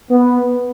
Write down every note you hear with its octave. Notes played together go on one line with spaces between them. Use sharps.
B3